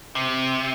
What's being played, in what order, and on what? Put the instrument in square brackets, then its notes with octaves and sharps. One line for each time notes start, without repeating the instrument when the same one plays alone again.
[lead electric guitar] C3